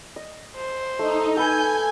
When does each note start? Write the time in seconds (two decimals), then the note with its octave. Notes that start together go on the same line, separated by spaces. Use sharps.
0.16 D#5
0.56 C5
0.99 A3 D#4
1.37 A4 B4 G#5 G6